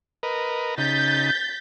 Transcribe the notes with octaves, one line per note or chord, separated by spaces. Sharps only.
A#4 B4 D#5
C#3 D#4 G6 A6 B6